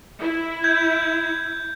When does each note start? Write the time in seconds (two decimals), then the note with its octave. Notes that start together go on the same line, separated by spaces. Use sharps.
0.20 E4
0.64 G6 G#6